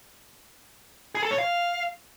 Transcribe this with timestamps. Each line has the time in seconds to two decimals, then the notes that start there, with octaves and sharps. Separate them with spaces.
1.15 G#4
1.23 A4
1.31 C#5
1.38 F5